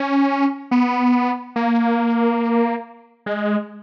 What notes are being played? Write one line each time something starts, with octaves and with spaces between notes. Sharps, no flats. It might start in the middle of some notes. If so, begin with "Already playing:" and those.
Already playing: C#4
B3
A#3
G#3